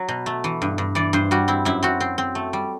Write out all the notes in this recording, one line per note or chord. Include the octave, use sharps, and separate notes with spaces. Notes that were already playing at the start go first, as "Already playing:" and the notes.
Already playing: F#3
B2
A3
E3
G2
G2
E3 D5
G2 C5
G3 F#4
C4 E4
F#2 E4
C4 F#4
C4
C4
A3
G3